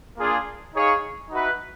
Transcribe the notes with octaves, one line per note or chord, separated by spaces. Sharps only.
A#3 D4 F4 G#4
D#4 G#4 C#5 F5
D#4 F#4 B4 E5